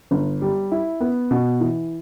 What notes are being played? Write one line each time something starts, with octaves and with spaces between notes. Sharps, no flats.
G1
G3
E4
B3
B2
E3